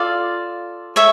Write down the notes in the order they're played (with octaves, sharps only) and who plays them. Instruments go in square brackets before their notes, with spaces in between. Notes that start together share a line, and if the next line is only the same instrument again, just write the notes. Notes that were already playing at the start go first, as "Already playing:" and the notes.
Already playing: [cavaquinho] F4 A4 D5 F5
A4 C#5 E5